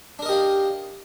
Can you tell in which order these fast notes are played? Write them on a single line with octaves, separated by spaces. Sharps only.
D4 A#4 D#5 G4 F5